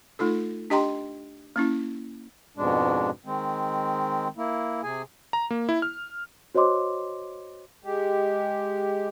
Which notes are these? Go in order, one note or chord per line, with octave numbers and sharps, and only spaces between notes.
A3 D#4 F4 A4
D4 G4 D#5 G5 A#5 C6
A#3 C#4 E4
F2 G#2 B2 G#3 D4
D#3 G#3 C4
A#3 E4
C3 G#4 G#5
A#5
A#3
E4
F6
F#4 C5 C#5 D#5 C6 D6
G#3 G4